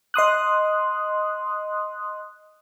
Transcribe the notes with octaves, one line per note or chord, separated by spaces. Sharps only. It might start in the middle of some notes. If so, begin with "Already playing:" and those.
D#5 C6 D#6 F#6